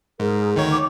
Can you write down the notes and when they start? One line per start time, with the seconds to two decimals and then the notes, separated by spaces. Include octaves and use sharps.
0.20 G#2 G#4 A#4
0.55 D2 D#3 C#5 D#5
0.70 C#6 D6